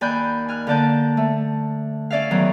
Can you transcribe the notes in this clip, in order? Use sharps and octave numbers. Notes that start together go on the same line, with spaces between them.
D#2 D5 G#5 B5 F#6 G6
G#5 F6 F#6
D3 A#3 D5 A5 G6
A3
C#4 D5 E5 F5
E2 D#3 F#3